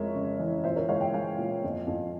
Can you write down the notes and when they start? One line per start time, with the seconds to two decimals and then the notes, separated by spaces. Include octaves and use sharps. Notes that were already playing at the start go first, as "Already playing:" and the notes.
Already playing: F2 G#3 A#4 C#5 E5
0.14 C#3
0.39 E3
0.64 A#2 C5 E5
0.76 A#4 C#5
0.89 G#3 C#5 F5
1.01 E5 G5
1.14 G#3 F5 G#5
1.38 A#2
1.64 F2
1.88 F2